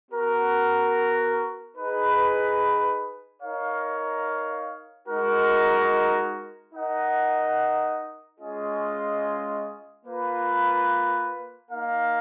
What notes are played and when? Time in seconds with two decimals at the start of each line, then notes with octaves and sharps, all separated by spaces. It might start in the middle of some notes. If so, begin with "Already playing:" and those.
0.10 B3 F#4 A#4
1.76 D#4 G#4 B4
3.42 D#4 A#4 C#5 F5
5.08 G#3 D#4 F#4 A#4
6.74 D#4 A#4 D#5 F#5
8.39 G#3 C#4 F4 G#4 D#5
10.05 A#3 F4 B4
11.71 A#3 D#4 A#4 F5